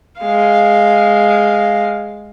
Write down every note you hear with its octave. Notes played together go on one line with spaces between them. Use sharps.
G#3 F5